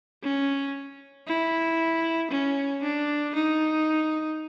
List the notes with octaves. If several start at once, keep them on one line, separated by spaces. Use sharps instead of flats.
C#4
E4
C#4
D4
D#4